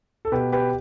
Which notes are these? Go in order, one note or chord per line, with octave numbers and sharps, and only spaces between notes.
A4
B2 G4 B4
G4 B4